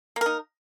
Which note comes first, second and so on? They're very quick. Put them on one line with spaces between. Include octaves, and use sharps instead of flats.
A#3 A#4 D#4